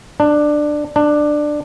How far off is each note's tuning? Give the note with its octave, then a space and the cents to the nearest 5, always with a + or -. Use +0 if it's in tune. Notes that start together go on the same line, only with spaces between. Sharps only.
D4 +15
D4 +15